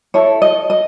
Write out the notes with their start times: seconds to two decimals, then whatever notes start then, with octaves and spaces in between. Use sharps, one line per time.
0.14 E4 A4 C#5
0.42 D#5
0.70 D#5